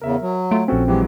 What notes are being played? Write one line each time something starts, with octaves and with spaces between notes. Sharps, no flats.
E2 C#3 A#4 E5
F#3
A3 F4 D7
A#1 C4 C#4 F#4 A4
E3 F#3 G#3 G4